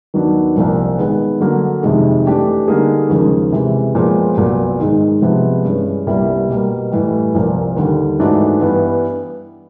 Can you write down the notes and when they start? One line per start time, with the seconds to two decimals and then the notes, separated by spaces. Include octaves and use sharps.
0.14 D#2 D#3 F#3 B3 D4
0.56 C2 A#2 F3
0.98 D#3 G#3 B3
1.40 D3 F#3 A#3
1.83 F2 C3 D#3 G#3
2.26 E3 A3 D4 G4
2.68 D3 G3 A#3 D#4 G#4
3.10 D#2 C#3 F3 G#3
3.52 C3 E3 G#3
3.95 A#2 F3 G#3 B3
4.37 C2 A#2 F#3 B3
4.80 G#2 D#3 G#3
5.22 C3 F3 G#3 B3
5.64 G2 E3 G#3 C#4
6.06 C2 A#2 G3 B3 E4
6.49 B2 G3 A#3
6.91 A2 E3 G3
7.34 C2 A#2 F3 A#3
7.77 D#2 D3 G3
8.19 G#2 E3 A3 D4 F#4
8.61 G2 E3 G3 B3